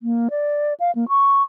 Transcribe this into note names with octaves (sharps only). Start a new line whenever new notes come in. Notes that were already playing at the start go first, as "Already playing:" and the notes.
A#3
D5
F5
A#3
C#6